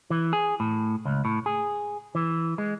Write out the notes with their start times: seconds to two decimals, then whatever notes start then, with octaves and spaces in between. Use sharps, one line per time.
0.10 E3
0.33 G#4
0.60 A2
1.06 C#2
1.25 A2
1.46 G#4
2.15 E3
2.58 G#3